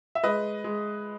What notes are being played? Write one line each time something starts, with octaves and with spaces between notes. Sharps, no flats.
E5
G#3 B4 D#5
G#3